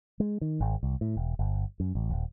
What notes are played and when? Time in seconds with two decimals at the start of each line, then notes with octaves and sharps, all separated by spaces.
0.20 G#3
0.41 D#3
0.60 G#1
0.83 C2
1.01 A2
1.17 E1
1.39 G1
1.80 F#2
1.95 A1
2.10 D#1